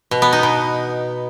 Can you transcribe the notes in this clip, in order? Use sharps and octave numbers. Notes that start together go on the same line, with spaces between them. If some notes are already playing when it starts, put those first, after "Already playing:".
B2
B3
D#4
B2